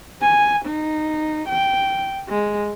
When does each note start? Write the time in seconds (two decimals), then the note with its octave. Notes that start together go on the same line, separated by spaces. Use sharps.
0.21 G#5
0.66 D#4
1.49 G5
2.29 G#3